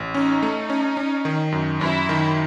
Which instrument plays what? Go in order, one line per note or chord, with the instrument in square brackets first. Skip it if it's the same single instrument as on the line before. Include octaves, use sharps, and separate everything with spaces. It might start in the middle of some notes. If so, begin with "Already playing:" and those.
Already playing: [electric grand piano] A1
[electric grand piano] C#4 [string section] D#4
[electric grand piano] A3
C#4
C#4
D#3
F#2
[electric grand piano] F#2 [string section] E4
[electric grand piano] D#3